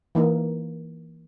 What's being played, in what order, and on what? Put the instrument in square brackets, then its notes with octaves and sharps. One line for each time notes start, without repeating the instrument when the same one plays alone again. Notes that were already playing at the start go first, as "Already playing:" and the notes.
[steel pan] E3 A#3 D#4